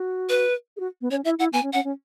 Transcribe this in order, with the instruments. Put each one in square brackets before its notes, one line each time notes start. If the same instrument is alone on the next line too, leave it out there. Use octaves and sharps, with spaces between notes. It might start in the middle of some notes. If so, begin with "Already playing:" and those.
Already playing: [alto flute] F#4
[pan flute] B4
[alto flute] G#4
F#4
B3
[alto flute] C#4 [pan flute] C#5
[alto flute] E4 [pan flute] E5
[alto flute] E4 [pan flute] F#5
[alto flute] B3 [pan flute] G#5
[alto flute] C#4
[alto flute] C#4 [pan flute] F#5
[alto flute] C#4